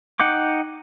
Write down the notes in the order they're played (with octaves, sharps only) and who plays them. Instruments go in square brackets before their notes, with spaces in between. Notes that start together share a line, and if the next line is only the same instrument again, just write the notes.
[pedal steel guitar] D#4 F#5 G5 D6